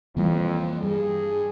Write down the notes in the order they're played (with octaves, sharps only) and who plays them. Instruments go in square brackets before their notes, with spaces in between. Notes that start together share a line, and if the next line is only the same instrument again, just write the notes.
[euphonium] F2 [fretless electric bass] E3 [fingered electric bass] G3 A#3
[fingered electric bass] G2 [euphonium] G#4